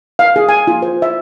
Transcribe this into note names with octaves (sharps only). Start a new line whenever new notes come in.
F5
G#4
G#5
F4
C5
E5